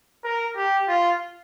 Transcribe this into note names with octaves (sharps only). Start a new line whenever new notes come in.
A#4
G4
F4